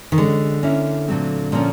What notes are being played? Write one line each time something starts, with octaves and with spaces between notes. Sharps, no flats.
D#3
D3 G#3 C#4 F#4
A#3 C#4 E4
A#2 F#3 A3 C4
A#2 F3 A#3 C#4